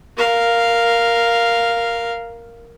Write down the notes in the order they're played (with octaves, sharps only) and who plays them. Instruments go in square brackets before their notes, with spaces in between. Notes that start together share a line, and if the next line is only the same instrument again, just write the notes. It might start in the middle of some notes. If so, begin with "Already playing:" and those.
[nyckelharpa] A#4 F5